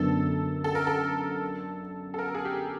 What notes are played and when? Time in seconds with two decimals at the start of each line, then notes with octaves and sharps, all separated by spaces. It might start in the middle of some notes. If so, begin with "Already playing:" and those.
Already playing: F#2 D3 F#3 B3 A4
0.64 A4
0.75 A#4
0.87 A4
2.14 A4
2.19 A#4
2.35 G#4
2.45 G4